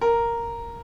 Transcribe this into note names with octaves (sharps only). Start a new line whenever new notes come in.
A#4